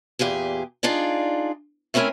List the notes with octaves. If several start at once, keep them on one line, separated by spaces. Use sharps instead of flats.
E2 A#2 G4 G#4
D4 D#4 F4 G#4 D5
A3 C4 C#4 E4 A#4 G#5